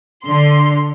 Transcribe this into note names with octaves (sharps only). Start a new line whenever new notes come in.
D3 C6